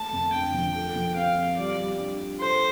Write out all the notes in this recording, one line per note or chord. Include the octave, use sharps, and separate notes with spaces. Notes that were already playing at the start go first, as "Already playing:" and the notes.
Already playing: A3 A5
F2
D3 G5
F3
A4
F3
C4 F5
F4
G3 D5
G3
D4
F4
A4 C5